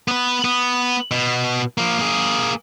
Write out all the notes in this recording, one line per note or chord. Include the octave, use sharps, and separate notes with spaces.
B3 B4
B3
B2
F3 A#3
A#3 G#4